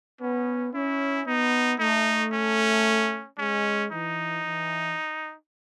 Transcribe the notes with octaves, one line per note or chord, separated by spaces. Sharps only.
B3 C#4
C#4 E4
B3 D#4
A3 D#4
C#4
G#3 C#4
E3 D#4
E3